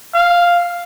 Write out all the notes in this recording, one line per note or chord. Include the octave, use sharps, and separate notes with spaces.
F5